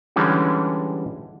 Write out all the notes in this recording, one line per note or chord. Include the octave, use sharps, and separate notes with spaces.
D3 E3 G3 G#3 C#4